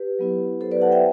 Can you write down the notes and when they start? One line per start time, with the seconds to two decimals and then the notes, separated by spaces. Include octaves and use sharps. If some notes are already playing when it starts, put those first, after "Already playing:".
Already playing: G4 B4
0.19 F#3 B3 E4
0.61 A4 C5
0.71 B4 D5
0.81 F#5 A5
0.92 E5 G5